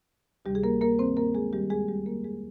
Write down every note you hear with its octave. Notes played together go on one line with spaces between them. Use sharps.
D2 C3 D#3 G3 G4
G#4
A#3 A#4
A#3 A#4
G2 D#3 C4 C5
A#3 A#4
G#3 G#4
D#2 D#3 G3 G4
G#3 G#4
G3 G4
F2 D#3 A#3 A#4
G#3 G#4